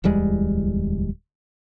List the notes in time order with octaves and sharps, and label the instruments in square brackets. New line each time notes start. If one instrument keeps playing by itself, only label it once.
[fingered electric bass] D1 E2 G3 G#3